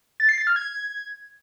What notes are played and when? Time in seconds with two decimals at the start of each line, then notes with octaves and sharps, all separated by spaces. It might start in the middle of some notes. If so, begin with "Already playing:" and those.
0.20 A6
0.29 C7
0.38 A6
0.47 F6
0.56 G#6